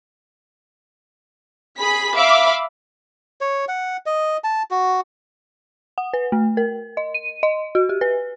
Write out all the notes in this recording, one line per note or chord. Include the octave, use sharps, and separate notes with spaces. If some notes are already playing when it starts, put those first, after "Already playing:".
G#4 B5 B6
E5 F5 B5 D6
C#5
F#5
D#5
A5
F#4
F#5
B4
A3
A#4
D#5
D#7
D#5
F#4
G4
B4